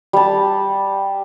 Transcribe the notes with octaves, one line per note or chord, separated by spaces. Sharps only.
G3 A5